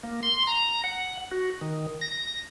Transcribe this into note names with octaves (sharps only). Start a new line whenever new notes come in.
A#3
C6
A#5
F#5
F#4
D#3
A#6